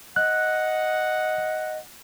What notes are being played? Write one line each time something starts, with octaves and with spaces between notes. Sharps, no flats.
D#5 F#5 F#6